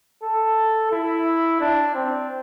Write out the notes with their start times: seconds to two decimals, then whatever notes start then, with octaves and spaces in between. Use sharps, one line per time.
0.22 A4
0.91 E4
1.60 D4
1.94 C4